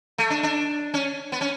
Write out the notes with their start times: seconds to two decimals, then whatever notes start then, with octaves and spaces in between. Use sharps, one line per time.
0.18 A3
0.30 D4
0.43 D4
0.94 C#4
1.32 B3
1.41 C#4